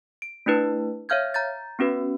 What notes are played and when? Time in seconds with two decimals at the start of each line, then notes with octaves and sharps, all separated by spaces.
0.22 D7
0.46 A3 D4 E4 B4
1.09 C#5 E5 F5 F6 G6 G#6
1.34 A#5 G6 A6
1.79 B3 C#4 F#4 B4